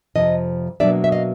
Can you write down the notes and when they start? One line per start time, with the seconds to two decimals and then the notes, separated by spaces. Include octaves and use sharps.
0.16 F2 C3 F3 D#5
0.80 B2 F#3 A#3 D4 D5 E5
1.04 E5
1.12 D#5 F5